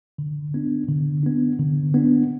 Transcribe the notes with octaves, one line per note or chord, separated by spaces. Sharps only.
D3
B3 D4
D3
B3 D4
D3
B3 D4